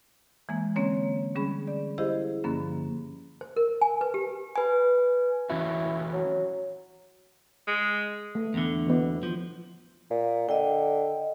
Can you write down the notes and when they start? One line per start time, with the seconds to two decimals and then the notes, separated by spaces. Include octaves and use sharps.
0.49 E3 G#3 A#3
0.76 D3 A#3 C4 C#4 C#5
1.35 D3 G3 C#4 G#4 B5
1.67 D5
1.98 E4 G4 G#4 C5 D#5 F5
2.44 G2 D3 F3 A#3 C#4
3.41 C5
3.56 A#4
3.81 G#5
4.01 B4
4.14 G4
4.56 B4 G#5
5.50 E3 C#4 E4 F#4
6.13 F#3
7.67 G#3
8.35 A3
8.54 E2 D3
8.87 E3 B3
9.23 F3
10.10 A#2
10.49 D3 D#5 G5